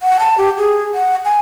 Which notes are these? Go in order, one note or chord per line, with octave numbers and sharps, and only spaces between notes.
F#5
A5
G4
G#4
F#5
G#5